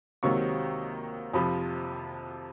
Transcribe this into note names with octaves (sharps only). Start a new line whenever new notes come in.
C#2 C3 D#3 F#3 A#3 C#6
F2 C3 F3 B5